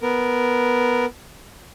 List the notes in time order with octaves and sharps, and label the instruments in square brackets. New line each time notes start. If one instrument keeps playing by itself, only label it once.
[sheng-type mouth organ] B3 A#4